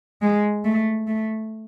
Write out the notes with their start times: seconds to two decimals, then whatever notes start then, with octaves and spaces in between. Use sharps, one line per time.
0.22 G#3
0.65 A3
1.07 A3